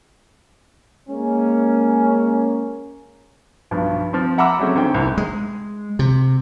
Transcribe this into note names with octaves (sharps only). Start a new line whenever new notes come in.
G#3 A#3 C#4
B1 G2 F3
F3 C4
E5 F#5 A#5 B5 D6 E6
F#3 G#3 A3 C4 C#4
G#1 G#2 D3 G5
C2 G#2
G#3
C3